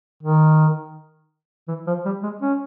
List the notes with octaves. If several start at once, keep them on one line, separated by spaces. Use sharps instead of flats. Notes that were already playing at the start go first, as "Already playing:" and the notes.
D#3
E3
F3
G3
G#3
C#4